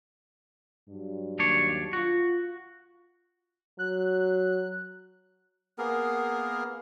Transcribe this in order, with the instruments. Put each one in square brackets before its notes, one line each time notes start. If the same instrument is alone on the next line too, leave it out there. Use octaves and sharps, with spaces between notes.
[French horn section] G2 F#3
[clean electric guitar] D#2 D4 C#5
[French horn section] F4 [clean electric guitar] F#4
[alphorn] F#3 [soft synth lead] F#6
[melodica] A#3 B3 G#4 A#4